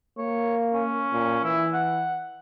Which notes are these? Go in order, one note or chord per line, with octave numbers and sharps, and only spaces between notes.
A#3 C#5
C#4
A#2
E3 E4
F#5